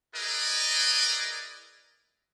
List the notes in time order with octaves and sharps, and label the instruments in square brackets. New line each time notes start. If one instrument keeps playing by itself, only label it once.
[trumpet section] E4 G#4 A#4 B4 D5 D#5